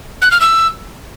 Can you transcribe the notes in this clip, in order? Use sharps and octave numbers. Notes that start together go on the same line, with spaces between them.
F#6
F6
E6